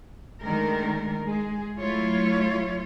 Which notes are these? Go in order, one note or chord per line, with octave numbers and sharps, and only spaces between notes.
D#3 G#3 A3 D4 A#4
G#3 G#4
F#3 A3 E4 F4 C#5